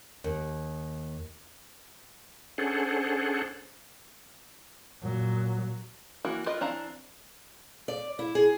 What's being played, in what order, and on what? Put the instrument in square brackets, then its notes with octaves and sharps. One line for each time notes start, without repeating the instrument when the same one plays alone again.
[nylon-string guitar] D#2
[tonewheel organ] C#4 D4 G#4 A4 C5 F#5
[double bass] A#2 F#3
[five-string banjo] E3 A#3 F#4
F4 A#4 B4 D#5
E3 C4 D4 F5 A#5
[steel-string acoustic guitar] D5
E4
G#4